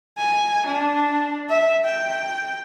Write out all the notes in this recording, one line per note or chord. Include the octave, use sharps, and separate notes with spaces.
G#5
D4
E5
G5